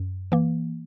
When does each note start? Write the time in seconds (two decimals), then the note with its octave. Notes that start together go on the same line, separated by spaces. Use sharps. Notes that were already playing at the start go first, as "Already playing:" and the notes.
Already playing: F#2
0.32 E3 A#3